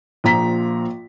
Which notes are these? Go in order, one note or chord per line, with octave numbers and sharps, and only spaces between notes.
A#1 A#2 F3 A#5 B6